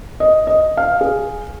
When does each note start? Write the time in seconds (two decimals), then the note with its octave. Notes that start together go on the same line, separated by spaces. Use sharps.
0.20 D#5
0.47 D#5
0.77 F5
1.01 G#4